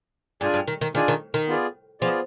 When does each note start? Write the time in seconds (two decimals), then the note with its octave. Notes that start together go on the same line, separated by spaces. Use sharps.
0.41 G2 D4 F4 G#4 D5 G#5
0.54 G2
0.68 D#3
0.81 D#3
0.95 D#3 D4 F4 G#4 D5 G#5
1.08 D#3
1.34 D#3
1.48 B3 F4 G#4 D5
2.01 F3 B3 F4 G#4 D5